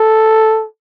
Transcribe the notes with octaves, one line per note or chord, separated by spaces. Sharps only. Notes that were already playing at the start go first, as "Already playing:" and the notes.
Already playing: A4